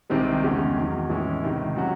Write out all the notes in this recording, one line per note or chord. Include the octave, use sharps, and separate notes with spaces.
C2 C3 D#3 G#3 C4
E2 C#3 G#3 C#4
E2 D#3 F#3
A2 E3 G#3 C#4 E4
C#2 C3 D#3
C3 F#3 C#4 F#4